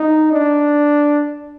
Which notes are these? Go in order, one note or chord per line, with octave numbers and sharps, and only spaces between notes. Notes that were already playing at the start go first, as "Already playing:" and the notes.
Already playing: D#4
D4